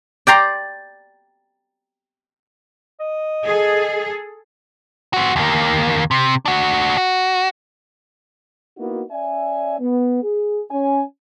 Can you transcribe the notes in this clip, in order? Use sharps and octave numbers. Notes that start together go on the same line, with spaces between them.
D5 G5 A#5 C6
D#5
G#4 A4
C4 F#4
D#2 A#3
C3
D4 F#4
F#4
A#3 B3 D#4 E4 F#4
C#4 D5 E5 G#5
B3
G#4
C#4 G#5